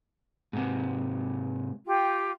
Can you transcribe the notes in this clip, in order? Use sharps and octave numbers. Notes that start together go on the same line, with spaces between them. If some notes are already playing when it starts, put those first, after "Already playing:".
G#2 C3
F4 G4 G5